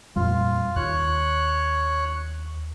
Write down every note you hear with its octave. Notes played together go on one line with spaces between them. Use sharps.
F2 A#2 G3 F4
D#2 C#5 F#6